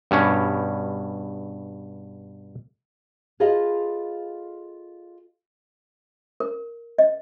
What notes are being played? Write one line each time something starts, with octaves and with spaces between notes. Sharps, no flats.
G2 B2 C#4
F4 G#4 A4 B4 D#5 F5
A#4
D#5